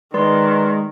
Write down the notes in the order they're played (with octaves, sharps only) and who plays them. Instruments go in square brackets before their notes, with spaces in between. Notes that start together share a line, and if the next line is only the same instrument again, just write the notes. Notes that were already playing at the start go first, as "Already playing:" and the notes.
[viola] D#3 [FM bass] G#3 [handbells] B4 D5 C6